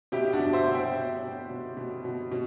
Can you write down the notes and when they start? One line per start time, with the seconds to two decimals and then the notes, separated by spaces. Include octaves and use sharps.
0.12 B2 E4 G4
0.33 D4 F#4
0.39 B2
0.53 C5 E5
0.67 B2
0.74 E5 G5
0.95 B2
1.23 B2
1.50 B2
1.77 B2
2.05 B2
2.32 B2